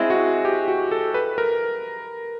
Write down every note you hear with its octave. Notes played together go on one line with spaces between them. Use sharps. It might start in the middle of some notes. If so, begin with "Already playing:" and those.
Already playing: G#3 C4 E4
F#4
G4
F#4
A4
B4
A#4